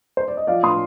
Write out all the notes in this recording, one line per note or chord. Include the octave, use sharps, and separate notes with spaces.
C5
D5
D#5
F3 D5 F5
A2 C6 D#6